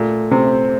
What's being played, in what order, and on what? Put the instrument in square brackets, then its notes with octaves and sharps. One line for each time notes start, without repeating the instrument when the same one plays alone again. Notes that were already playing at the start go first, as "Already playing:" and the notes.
Already playing: [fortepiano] A#2 [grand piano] A3
[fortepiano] C3 [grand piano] C4